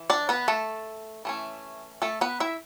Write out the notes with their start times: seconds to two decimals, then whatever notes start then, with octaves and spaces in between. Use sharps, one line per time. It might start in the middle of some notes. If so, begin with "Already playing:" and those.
Already playing: E3
0.10 D4 D5
0.29 B3 B4
0.48 A3 A4
1.25 E3 A3 C#4
2.02 A3 A4
2.21 B3 B4
2.40 E4 E5